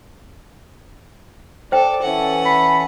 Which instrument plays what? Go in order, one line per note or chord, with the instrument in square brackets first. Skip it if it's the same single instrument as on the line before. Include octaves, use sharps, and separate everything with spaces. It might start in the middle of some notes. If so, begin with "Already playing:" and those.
[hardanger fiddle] A4 [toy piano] C5 G5 [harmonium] D5
[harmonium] E3 A4 [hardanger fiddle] C#4 F#5
[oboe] B5